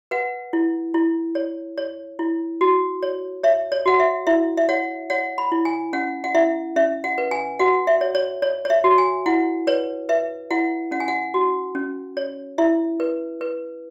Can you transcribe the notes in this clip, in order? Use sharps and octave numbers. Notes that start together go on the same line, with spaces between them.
B4 F#5
E4
E4
C#5
C#5
E4
F#4
C#5
C#5 E5
C#5
F#4 F#5
E5
E4 E5
E5
C#5 F#5
C#5 F#5
B5
E4
G#5
C#4 F#5
F#5
E4 E5
C#4 E5
F#5
B4
G#5
F#4 F#5
E5
C#5
C#5
C#5
C#5
E5
F#4
G#5
E4 F#5
B4 C#5
B4 E5
E4 F#5
C#4 F#5
G#5
F#5
F#4
C#4
C#5
E4 E5
B4
B4